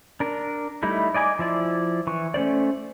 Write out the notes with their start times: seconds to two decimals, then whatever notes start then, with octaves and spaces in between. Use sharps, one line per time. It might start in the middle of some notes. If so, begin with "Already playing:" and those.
0.20 D4 A#4
0.83 G3 A3 D#4 E4
1.14 D5 D#5 G#5 A#5 D6
1.39 F3 E4 D5
2.07 E3 C#6
2.34 A3 C#4 C5 D5